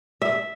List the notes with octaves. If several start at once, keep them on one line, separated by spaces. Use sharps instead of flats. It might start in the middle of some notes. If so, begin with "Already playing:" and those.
E5